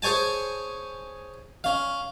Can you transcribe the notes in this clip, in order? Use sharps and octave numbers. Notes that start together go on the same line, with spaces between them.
G#4 C5 C#5 G#5 A5
C#4 F5